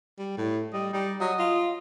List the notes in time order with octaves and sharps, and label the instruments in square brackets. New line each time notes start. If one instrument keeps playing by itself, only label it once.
[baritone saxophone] G3
A2
[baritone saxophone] G3 [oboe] D#5
[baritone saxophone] G3 [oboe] D#4
[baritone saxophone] F#3 [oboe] D#5
[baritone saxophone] F4